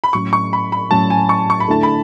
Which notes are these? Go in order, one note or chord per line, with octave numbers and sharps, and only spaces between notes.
B5
A2 F#3 C#4 C#6
C#6
B5
B5
A2 F#3 C#4 A5
G#5
C#6
C#6
B5
D3 A3 E4 A4 A5
B5